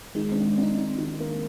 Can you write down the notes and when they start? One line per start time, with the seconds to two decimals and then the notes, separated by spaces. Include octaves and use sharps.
0.15 D#3 G#3
0.32 C4 D4
0.58 D4 D#4
0.78 D4 D#4
0.98 D#3
1.20 A#3